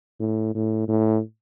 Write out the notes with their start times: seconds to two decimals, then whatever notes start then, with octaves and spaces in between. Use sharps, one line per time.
0.20 A2
0.55 A2
0.88 A2